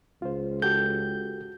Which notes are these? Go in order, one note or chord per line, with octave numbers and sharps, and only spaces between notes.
C#2 F4 C5
F#4 G4 A4 G6